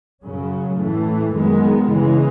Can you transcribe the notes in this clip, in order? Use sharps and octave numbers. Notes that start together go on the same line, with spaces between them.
F#2 C#3 F#3 C#4
A2 E3 A3
F#2 D#3 G#3 B3
C#3 E3 G#3